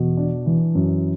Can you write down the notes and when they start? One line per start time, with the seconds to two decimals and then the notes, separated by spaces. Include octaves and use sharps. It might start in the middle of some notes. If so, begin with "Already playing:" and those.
Already playing: E2 B2
0.17 D4
0.46 E3
0.75 F#2